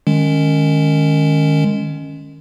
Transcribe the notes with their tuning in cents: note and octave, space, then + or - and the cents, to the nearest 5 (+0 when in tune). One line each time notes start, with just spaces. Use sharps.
D#3 -20 G#3 +0 C#4 +0